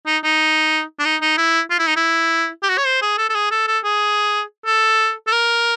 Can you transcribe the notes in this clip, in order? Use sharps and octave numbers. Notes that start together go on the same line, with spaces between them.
D#4
D#4
D4
D#4
D#4
E4
F4
E4
D#4
E4
G4
F#4
C#5
C5
G#4
A4
A4
G#4
A4
A4
G#4
A4
A4
A#4